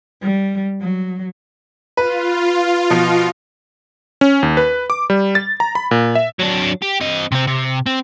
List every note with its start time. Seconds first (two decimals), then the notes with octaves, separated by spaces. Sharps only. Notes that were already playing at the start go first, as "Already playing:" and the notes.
0.22 G3
0.81 F#3
1.97 F4 B4
2.90 B2 F3
4.21 C#4
4.43 D#2
4.57 B4
4.90 D6
5.10 G3
5.35 A6
5.60 A#5
5.75 B5
5.91 A#2
6.15 E5
6.39 F#3 D4
6.82 G4
7.01 C4 D#5
7.32 C3 C4
7.47 C3
7.86 C4